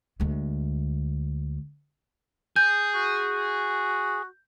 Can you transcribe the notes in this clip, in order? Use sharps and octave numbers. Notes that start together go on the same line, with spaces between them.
D2 G#3
G#4 G6
F#4